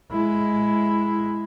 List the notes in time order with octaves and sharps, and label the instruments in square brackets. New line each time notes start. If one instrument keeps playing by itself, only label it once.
[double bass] G#3 E4